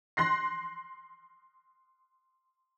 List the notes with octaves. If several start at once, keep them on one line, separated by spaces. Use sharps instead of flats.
C6 F#6 A#6 C7